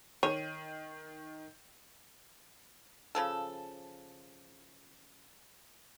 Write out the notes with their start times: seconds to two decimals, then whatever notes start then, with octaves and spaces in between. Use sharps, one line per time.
0.23 D#3 C#5 D#7
3.15 C#3 F3 A4